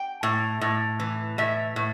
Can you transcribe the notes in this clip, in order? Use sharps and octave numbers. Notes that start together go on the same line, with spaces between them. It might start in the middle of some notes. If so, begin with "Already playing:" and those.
Already playing: G5
A2
A2
E3
A2 E5
A2